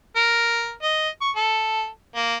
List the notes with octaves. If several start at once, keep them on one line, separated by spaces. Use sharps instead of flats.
A#4
D#5
C#6
A4
A#3